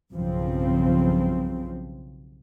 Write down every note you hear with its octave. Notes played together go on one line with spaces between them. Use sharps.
B1 G2 C#3 F3 C4